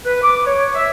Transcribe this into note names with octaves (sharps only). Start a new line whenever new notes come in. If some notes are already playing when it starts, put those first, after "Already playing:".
B4
D6
C#5
E5